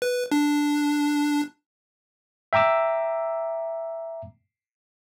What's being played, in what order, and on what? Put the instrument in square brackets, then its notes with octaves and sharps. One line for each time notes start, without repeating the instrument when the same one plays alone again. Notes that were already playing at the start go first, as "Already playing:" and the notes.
[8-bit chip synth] B4
D4
[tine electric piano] E5 G5 A#5 D6 E6